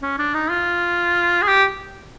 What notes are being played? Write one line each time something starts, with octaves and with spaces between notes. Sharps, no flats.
C#4
D4
D#4
F4
G#4
G4